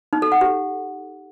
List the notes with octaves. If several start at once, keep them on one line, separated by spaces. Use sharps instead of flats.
D#4
A4
F#5
G4